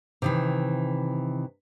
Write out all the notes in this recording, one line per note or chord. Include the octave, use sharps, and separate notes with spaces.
C3 D#3 E3